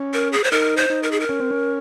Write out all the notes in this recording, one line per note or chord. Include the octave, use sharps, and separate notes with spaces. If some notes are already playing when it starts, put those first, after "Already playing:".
Already playing: C#4
A#4
G#4
C5
D#4 A#4
C5
D#4
A#4
G#4
A#4
C#4
C4
C#4